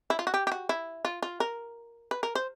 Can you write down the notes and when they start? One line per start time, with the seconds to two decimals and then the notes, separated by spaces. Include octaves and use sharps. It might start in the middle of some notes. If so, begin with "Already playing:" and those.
0.10 E4
0.19 F4
0.27 F#4
0.34 G4
0.47 G4
0.52 F#4
0.69 E4
1.05 F4
1.22 F4
1.40 A#4
2.11 B4
2.23 A#4
2.35 C5